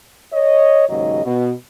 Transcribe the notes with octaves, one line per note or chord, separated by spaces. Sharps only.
C#5 D#5
D#2 G#2 C#3 F#3 D#5
B2